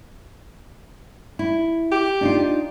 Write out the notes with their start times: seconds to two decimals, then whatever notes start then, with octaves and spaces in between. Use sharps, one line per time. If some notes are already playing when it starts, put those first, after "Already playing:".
1.39 E4
1.91 G4
2.21 D4 D#4 F4